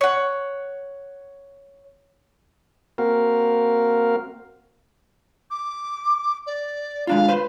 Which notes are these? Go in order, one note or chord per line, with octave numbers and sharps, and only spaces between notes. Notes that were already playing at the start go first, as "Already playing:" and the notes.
C#5 F#5
A#3 C4 F#4 A#4 F5
D6
D5
G#3 D4 F4 F5
B4 C5